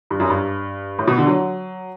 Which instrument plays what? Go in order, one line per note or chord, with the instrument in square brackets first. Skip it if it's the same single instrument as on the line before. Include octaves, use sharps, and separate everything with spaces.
[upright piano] G2
F#2
G2
A2
B2
D3
F#3